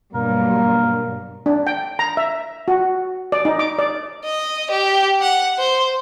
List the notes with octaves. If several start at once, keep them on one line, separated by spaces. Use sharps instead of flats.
G2 B2 F#3 A#3 A#4
D4
G5
A#5
E5
F#4
D5
D#4
D6
D5
D#5
G4
F#5
C5